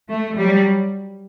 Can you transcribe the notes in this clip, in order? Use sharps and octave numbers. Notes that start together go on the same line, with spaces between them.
A3
F#3 G3